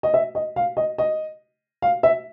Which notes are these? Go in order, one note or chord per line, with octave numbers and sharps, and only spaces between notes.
D#5
E5
D#5
F5
D#5
D#5
F5
E5